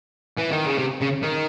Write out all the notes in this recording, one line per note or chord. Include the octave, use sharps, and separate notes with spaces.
E3
D#3
C#3
C3
C#3
D#3